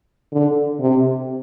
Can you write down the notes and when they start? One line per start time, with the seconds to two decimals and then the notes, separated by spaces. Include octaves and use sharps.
0.32 D3
0.80 C3